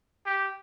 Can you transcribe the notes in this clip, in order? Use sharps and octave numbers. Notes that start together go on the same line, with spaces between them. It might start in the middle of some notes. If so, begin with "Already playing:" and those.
G4